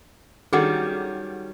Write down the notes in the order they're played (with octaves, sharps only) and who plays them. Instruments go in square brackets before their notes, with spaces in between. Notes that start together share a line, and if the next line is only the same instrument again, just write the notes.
[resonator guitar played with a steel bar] D#3 G3 C#4 [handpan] F#4 [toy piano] G#4 A4 F#5